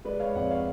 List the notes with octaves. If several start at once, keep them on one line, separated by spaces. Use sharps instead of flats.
G#3 B4 D5
C#5 F5
F2 D5 F#5
C#5 F5